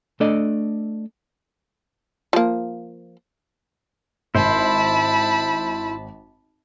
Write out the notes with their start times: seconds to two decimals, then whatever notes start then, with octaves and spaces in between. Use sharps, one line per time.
0.20 A3 D4 A4 D5 D#5
2.33 F3 A#3
4.35 G#1 E4 C5 A5 B5